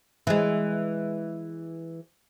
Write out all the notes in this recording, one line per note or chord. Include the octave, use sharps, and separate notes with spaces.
E3 G#3